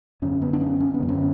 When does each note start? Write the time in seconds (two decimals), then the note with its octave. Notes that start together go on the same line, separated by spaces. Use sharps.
0.22 F#2 D3 C#4
0.42 B3
0.53 D4
0.61 C#4
0.80 C#4
0.94 B3
1.00 F#2 D3
1.09 C#4